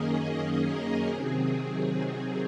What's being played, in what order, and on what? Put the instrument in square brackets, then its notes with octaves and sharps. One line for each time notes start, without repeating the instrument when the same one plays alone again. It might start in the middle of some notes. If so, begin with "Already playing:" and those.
Already playing: [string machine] F#2 D#3 A#3 C#4 G#4 D#5
A#4
C3 D#3 F#3 C4 G#4